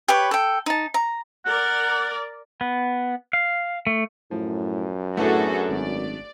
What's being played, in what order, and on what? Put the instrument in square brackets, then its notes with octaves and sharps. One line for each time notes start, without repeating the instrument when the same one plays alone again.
[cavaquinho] G4 B4 C#5
A4 G5
D#4 A5
A#5
[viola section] A#4 D5 [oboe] F#5
[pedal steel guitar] B3
F5
A3
[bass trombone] F#2 [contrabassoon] A2 [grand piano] F3
[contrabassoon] A2 [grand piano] A3 B3 D4 [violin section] F#4 G#4 A4
[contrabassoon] G#1 [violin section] D5